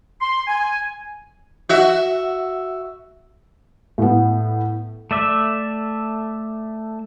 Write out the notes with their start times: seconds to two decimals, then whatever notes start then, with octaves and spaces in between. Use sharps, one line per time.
0.21 C6
0.47 G#5
1.69 F#4 E5
3.98 A2 B3
5.11 A3 D5 E5